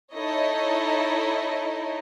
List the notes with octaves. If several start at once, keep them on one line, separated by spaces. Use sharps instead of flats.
D#4 E4 A4 C#5 D#5